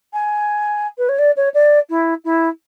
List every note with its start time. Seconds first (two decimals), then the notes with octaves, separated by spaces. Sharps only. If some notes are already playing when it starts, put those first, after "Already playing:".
0.13 G#5
0.98 B4
1.09 C#5
1.18 D5
1.36 C#5
1.54 D5
1.89 E4
2.24 E4